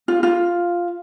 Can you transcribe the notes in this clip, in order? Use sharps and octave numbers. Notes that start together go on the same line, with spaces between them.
F4
F4